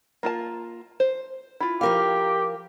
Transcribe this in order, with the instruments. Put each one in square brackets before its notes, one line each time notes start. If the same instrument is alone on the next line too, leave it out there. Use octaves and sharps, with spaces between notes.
[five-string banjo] A#3 F4 A5
C5
E4 F4
[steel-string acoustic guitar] F3 A#4 F5 [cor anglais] G4